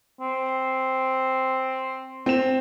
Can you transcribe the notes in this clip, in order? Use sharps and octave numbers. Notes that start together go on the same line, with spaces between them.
C4
C4 E7